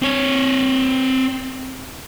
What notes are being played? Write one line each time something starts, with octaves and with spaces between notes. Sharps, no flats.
C4 C#5